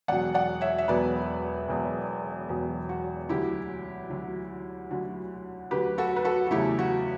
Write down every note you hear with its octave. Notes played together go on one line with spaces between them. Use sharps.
E1 E2 B2 F#3 D5 F#5
D5 F#5
C#5 E5
E5
E1 E2 B2 F#3 B4 D5
E1 E2 B2 F#3
E1 E2 B2 F#3
F#4
D2 D3 F#3 E4 G4
D2 D3 F#3
D2 D3 F#3
D2 D3 F#3 G4 B4
F#4 A4
B4
F#4 A4
F#4
E2 C#3 F#3 A3 E4 G4
F#4